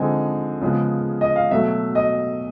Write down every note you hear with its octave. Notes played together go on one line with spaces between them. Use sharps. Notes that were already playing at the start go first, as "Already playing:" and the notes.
Already playing: D3 F3 G#3 C4 D#4 G#5
C#3 F3 G#3 B3
D#5
F5
B2 F#3 A3 E5
D#5